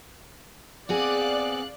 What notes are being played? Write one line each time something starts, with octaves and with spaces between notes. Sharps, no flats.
B3 C4 G#4 D5 F5 F#6